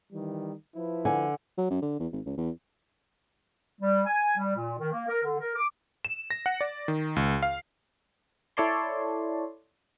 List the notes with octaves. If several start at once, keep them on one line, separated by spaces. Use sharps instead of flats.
D#3 E3 G3
F3 E4 B4
D3 G#5
F#3
F#2
D3
E2
G#1
C#2
E2
G3
G#5
G3
A#2
D#3
A#3
A#4
D3
A#4
D6
E7
A#6
F#5
D5
D#3
C#2
F5
E4 A4 C#5 D5 A5 C6